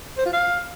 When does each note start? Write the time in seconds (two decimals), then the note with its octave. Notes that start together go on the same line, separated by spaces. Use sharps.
0.18 C5
0.25 F4
0.33 F5